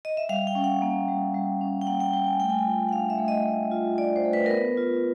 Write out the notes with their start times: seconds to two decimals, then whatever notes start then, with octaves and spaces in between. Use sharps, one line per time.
0.05 D#5
0.17 E5
0.29 G3 F5
0.47 G5
0.55 C#4
0.64 F#5
0.82 A#3
1.08 G3
1.34 G3
1.61 C#4
1.81 G5
1.87 A#3 F#5
2.00 G5
2.13 G3 G5
2.27 G#5
2.40 A3 G5
2.50 G#5
2.59 G5
2.66 F4
2.89 F#5
2.93 D4 F5
3.10 E5
3.19 A3
3.28 D#5
3.45 A3
3.72 F4
3.98 D4 D5
4.16 C5
4.25 A3
4.33 B4
4.46 A#4
4.50 B3 B4
4.77 F4